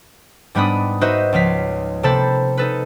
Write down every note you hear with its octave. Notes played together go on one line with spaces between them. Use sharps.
G#2 G3 B3 D4 B5 D#6
D#4 F#4 B4 C5 D#5 E5
C#2 F3 F5 B6
C3 A#3 A4 C5 A5 B5
D#4 A4 B4